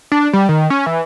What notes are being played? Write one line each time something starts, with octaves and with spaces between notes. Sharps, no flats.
D4
G3
D#3
C#4
E3